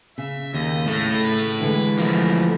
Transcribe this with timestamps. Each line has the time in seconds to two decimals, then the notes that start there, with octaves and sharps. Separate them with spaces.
0.18 C#3 E5
0.54 D#2 D#5
0.86 A2 A3
1.24 B4
1.60 D3 E3 G#3
1.99 F3 A3 A#4